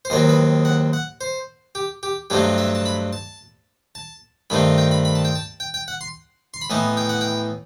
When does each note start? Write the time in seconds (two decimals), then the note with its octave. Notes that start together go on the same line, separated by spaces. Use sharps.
0.05 C5
0.10 D#2 D#3 F#3 C4 D#5
0.29 B4
0.65 F#5
0.93 F#5
1.21 C5
1.75 G4
2.03 G4
2.30 G2 F#3 A3 C4 D#4 G4
2.58 E5
2.75 A5
2.86 B5
3.13 A5
3.95 A5
4.50 G2 D#3 A3 C4 D#4 B5
4.78 G5
4.91 B5
5.05 B5
5.15 A5
5.25 G5
5.35 A5
5.60 G5
5.74 G5
5.88 F#5
6.01 C6
6.54 C6
6.62 B5
6.70 A2 E3 B3 D#4 A5
6.97 G5
7.09 F#5
7.21 G5